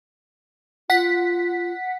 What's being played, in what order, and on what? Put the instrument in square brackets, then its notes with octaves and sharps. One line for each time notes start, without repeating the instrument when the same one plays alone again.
[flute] F4 [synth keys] F#5 B6